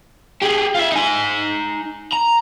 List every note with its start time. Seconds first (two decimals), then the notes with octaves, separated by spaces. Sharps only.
0.42 G4 G#4
0.75 F4 E5
0.92 D#4 G#5
2.12 A#5